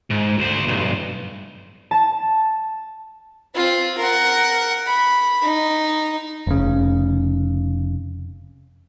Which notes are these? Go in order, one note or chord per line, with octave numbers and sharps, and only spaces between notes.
G#2
D2 C5
B1 G2
A5
C4 F4
A#4 F#5
B5
D#4
F1 C#3